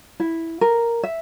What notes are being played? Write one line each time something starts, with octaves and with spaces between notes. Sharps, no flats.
E4
A#4
E5